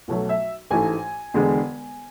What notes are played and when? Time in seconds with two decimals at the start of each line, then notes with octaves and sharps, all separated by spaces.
0.08 B1 B2 F#3 A3
0.29 E5
0.71 A1 G#2 E3 A3 G#5
1.34 E1 E2 D3 G#3